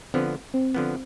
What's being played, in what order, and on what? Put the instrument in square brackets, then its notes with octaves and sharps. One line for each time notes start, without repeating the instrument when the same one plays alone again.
[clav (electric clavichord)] D3 F3 B3 [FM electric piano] C4
[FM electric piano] C4
[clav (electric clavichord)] D3 F3 B3